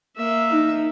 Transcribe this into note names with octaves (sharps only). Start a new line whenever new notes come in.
A#3 E5
D#4